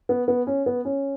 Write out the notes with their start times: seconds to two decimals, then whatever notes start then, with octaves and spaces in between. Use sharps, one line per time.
0.09 B3
0.28 B3
0.47 C#4
0.66 B3
0.85 C#4